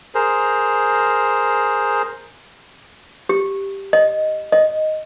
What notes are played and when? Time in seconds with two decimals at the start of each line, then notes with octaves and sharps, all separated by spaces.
0.15 G#4 A#4 C5
3.29 G4
3.93 D#5
4.52 D#5